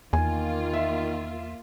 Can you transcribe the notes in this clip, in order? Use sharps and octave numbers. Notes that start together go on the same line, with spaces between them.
E2 D#3 A#3 F4 G#5
E5